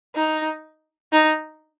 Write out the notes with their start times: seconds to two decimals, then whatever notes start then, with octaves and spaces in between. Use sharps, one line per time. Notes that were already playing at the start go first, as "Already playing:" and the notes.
0.15 D#4
1.12 D#4